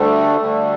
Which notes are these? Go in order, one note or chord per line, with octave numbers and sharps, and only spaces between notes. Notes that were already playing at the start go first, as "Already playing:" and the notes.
Already playing: D2 D3 G3 A3
D2 D3 G3